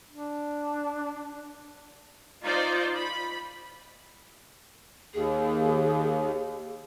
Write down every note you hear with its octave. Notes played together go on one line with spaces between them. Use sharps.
D4
D#4 F4 C5 D5
B5
D#2 G#4